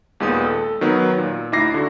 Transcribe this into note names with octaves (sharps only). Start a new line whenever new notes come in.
D#2 A#2 G#3 B3 D#6
A4
D#3 F#3 B3
A#2
D2 D#4 E4 D6 A#6 C7
D3 F#4